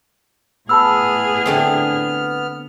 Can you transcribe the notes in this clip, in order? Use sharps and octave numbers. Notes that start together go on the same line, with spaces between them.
A2 B3 G#4 A5 B5 E6 F6
D3 A3 C4